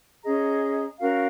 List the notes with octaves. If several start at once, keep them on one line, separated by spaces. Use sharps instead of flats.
C#4 G#4 D#5 A#5
C#4 F#4 A#4 F5